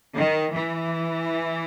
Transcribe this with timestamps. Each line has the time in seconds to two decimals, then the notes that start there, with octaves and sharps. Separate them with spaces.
0.15 D#3
0.51 E3